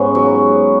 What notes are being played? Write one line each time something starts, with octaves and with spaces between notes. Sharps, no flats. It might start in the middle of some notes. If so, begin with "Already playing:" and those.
Already playing: G#2 B3 C#4
F#3